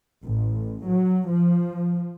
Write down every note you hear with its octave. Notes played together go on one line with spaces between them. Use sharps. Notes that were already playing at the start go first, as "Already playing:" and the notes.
A1
F#3
F3